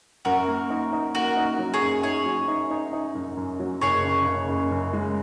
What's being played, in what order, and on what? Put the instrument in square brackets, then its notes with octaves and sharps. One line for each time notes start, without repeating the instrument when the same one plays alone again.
[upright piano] F#2 [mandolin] F#4 A#4
[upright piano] A#3
D#4
D#4
[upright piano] A#3 [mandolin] F#4 A#4
[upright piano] D#4
F#3
[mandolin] G#4 C#5
[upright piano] F#2
[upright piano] D#4 [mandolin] G#4 C#5
[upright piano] F#3
D#4
D#4
D#4
F#2
F#2
F#3
[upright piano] F#1 [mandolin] G#4 C#5
[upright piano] C#3
C#3
F#1
F#2
G#3